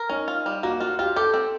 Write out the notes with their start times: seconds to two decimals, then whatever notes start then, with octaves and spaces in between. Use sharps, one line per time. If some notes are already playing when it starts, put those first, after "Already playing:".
Already playing: A#4
0.09 C#4 D#4
0.28 F4
0.46 G3
0.63 A#3 F#4
0.80 F4 F#4
0.99 F4 G4
1.16 G4 A4
1.34 C4